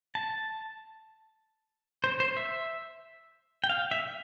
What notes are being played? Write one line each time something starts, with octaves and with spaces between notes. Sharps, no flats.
A5
C5
C5
E5
G5
F5
E5